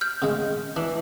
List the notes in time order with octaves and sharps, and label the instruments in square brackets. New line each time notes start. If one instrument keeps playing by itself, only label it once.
[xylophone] F6 G6
[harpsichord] C#3 G#3
[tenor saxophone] E3 [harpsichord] D4